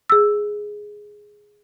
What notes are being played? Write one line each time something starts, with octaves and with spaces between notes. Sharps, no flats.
G#4 E6